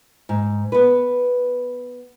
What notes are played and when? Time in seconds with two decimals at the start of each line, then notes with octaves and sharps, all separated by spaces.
0.29 G#2
0.72 B3 B4